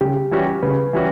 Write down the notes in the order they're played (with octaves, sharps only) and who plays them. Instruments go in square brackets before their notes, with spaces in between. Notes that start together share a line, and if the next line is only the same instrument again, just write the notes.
[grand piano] C#3 [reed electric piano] G4
[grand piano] E3 G3 C#4 F#4
[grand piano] C#3 [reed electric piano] B4
[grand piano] E3 G3 C#4 F#4